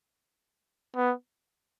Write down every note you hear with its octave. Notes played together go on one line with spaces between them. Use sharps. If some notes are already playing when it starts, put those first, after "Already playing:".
B3